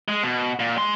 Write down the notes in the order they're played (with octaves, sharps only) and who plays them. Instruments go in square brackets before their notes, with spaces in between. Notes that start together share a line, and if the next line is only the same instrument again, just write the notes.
[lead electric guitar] G#3
B2
A#2
G#3 C6